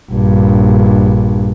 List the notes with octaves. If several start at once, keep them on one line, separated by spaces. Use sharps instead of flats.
A#1 G2